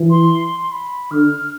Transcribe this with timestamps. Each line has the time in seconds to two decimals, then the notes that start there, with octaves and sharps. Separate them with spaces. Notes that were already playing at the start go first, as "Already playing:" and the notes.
Already playing: E3
0.10 C6
0.61 C6
0.72 B5
1.11 D3 F6